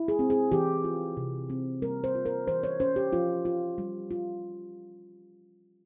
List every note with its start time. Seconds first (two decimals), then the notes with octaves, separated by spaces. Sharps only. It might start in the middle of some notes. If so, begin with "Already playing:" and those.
Already playing: E4
0.08 G#4
0.19 C4
0.30 G#4
0.52 E3 G4
0.84 F4
1.17 C3
1.50 C4
1.82 G3 A#4
2.04 C5
2.15 F4
2.26 A#4
2.47 E3 C5
2.63 C#5
2.80 C#4 C5
2.96 G4
3.13 F3 F4
3.45 F4
3.78 G3
4.11 F4